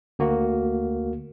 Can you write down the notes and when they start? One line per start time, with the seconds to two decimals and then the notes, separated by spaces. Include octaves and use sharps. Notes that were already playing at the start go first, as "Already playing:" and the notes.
0.19 D2 A#3 F#4